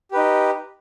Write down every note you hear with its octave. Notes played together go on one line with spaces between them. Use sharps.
D#4 G4 B4